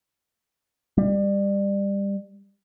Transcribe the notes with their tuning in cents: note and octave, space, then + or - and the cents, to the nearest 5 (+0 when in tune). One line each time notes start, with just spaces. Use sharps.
G3 +25